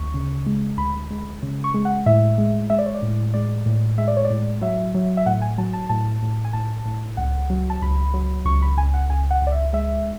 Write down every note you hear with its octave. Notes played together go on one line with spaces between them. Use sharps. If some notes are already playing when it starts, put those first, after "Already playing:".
Already playing: D2 C#6
C#3
G#3
D2 B5
G#3
C#3
C#6
G#3
F#5
A2 E5
G#3
G#3 E5
D5
C#5
D5
A2
G#3 D5
A2
G#3 E5
D5
C#5
D5
A2
F#3 E5
F#3
E5
A2 F#5
G#5
F#3 A5
A5
A2 A5
A2
G#5
A2 A5
A2
C#2 F#5
F#3
A5
C#2 B5
F#3
C#2 C#6
B5
C#2 G#5
F#5
C#2 G#5
F#5
C#2 D5
E5
G#3 E5